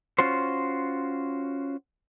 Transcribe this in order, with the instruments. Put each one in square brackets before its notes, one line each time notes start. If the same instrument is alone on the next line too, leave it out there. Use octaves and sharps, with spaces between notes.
[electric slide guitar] C#4 F4 F#4 C5